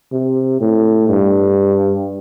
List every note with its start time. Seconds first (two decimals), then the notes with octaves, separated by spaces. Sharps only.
0.12 C3
0.61 A2
1.09 G2